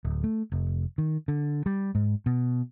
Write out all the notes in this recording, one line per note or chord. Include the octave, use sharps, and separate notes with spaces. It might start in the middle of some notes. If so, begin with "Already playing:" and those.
D1
A3
F1
D#3
D3
G3
G#2
B2